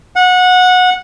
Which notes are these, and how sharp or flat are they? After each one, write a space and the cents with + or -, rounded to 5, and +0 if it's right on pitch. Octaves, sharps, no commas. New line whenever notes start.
F#5 -20